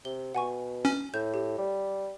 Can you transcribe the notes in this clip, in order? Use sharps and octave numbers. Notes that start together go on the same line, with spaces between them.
C3 G7
B2 F#5 G#5 C#6
C#4
A2 G6
G4
G3